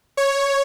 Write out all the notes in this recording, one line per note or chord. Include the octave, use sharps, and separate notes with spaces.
C#5